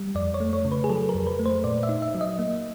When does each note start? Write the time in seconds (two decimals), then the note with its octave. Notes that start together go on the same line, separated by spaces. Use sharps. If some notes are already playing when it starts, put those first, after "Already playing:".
Already playing: G3
0.15 F2 D5
0.34 C#5
0.40 A3
0.53 C#5
0.65 C#3
0.72 B4
0.84 G#4
0.89 F#3 A4
1.09 A#4
1.15 F2
1.27 B4
1.39 A3
1.46 C5
1.64 A#2 D5
1.83 E5
1.89 D#4
2.02 E5
2.15 F#3
2.21 D#5
2.39 A#3